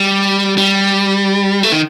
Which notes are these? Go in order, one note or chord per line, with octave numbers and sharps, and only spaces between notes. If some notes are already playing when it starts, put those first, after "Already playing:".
Already playing: G3
G3
A3
D#3